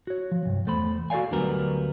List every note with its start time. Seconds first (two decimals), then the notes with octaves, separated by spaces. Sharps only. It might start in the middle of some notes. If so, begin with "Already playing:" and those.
0.07 F#4 C#5
0.31 F3
0.45 C2 G2
0.66 E2 A3 C5 B5
1.10 F#4 A4 C5 D5 F5 G#5
1.31 D2 D3 F#3 G3 B3 A#4